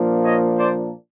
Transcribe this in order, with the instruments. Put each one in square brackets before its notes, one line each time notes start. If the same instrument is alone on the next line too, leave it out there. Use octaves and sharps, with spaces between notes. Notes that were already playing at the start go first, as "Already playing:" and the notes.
Already playing: [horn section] A#2 F3 A#3 D4
C#5 D#5
C5 D5